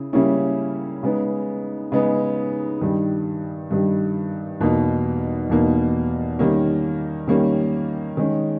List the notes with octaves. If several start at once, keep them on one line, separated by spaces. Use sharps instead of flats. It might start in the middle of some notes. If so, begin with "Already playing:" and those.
Already playing: C#3 E4
C#3 G3 A#3 C#4 E4
C#3 G#3 B3 D#4
C#3 G#3 B3 D#4
G2 D#3 G3
G2 D#3 G3
E2 B2 A#3 D#4
E2 B2 A#3 D#4
D#3 G3 A#3 C#4
D#3 G3 A#3 C#4
D#3 G#3 C#4